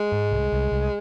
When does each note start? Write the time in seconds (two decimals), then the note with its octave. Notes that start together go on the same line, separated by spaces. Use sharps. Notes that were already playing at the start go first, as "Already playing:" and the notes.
Already playing: G#3
0.12 G#2
0.31 C2
0.52 C2
0.71 C2